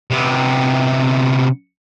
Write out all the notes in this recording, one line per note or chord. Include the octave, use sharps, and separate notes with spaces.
C3 B3